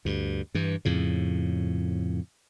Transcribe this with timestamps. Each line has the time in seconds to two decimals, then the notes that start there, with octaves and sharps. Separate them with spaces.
0.05 D2 G2
0.55 G2 E3
0.85 F2 A2 C#3